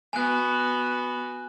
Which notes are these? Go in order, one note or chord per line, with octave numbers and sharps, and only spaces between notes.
B3 F#4 G#5 F#6